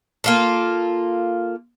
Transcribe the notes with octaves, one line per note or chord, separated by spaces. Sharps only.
A#3 F4 A4